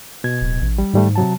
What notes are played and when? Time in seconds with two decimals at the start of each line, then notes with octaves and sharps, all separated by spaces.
0.24 B2 G#6
0.41 D1
0.61 A1
0.78 G3
0.93 G#2 D#3 G3 A3
1.16 C3 F#3 A5